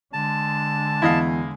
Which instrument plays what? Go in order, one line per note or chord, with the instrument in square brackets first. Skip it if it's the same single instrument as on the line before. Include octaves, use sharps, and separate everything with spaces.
[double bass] D3 G#3 [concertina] A5
[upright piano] E2 [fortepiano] E4 D#5 F5